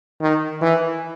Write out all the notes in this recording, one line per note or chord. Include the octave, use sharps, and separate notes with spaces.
D#3
E3